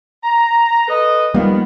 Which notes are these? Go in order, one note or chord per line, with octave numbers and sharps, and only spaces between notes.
A#5
A4 B4 D#5
D#3 F3 G3 A#3 B3